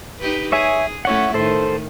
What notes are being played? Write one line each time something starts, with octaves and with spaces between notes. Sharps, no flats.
D#4 G4 B4
G#4 C#5 E5 G#5
A3 C#4 E4 C#5 F#5
A2 D#3 A4 C5